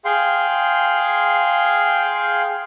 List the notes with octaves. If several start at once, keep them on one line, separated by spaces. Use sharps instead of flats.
G#4 F5 G5 C6